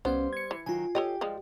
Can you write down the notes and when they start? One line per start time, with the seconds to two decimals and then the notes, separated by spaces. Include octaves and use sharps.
0.05 C2 G3 B3 C#4 C5 F5
0.33 G#6 C#7
0.51 E3
0.66 D#3 F#3 F4 G#5
0.95 G4 A4 C#5 D#5
1.21 F3 G3 G#3